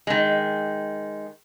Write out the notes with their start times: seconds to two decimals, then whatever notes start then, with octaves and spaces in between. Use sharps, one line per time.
0.07 D#3 G#3